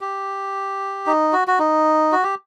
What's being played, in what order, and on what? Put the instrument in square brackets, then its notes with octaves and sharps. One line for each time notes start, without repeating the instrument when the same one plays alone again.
[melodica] G4
D#4
F#4
F#4
D#4
F#4
G4